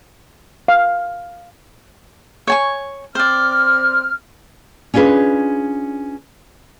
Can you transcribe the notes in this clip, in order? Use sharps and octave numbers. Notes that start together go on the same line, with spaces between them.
F5
C#5 G#5 C#6
C4 C5 D5 F6
C#4 D4 F4 G#4 B4